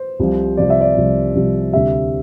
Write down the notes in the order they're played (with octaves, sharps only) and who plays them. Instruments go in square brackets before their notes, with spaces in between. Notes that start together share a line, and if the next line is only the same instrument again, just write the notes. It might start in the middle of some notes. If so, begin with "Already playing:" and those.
Already playing: [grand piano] C5
C2 C3 F3
C2 C3 F3 D5
E5
D5
C2 C3 F3
C2 C3 F3
D2 C3 G3 E5